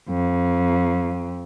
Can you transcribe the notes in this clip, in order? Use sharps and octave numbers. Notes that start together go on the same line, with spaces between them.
F2